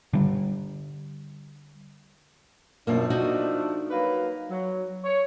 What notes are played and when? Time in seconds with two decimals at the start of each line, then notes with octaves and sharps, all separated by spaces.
0.13 D3 G3
2.87 F#2 B2 F3 A3 A#3 D4
3.10 D#4 F#4 D#5
3.91 F#3 A#3 B4
4.50 F#3
5.04 C#5